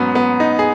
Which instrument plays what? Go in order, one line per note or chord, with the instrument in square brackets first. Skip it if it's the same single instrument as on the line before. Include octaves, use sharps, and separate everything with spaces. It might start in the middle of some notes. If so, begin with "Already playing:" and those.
Already playing: [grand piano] G#2 F#3 B3 C#4
B3
D#4
G#4